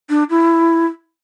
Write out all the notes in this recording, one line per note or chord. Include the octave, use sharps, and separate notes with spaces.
D4
E4